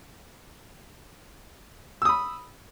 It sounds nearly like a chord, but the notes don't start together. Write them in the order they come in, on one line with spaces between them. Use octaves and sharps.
E6 D#6 B5